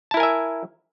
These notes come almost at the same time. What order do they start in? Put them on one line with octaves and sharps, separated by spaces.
A5 E4 A#4 G#5 E5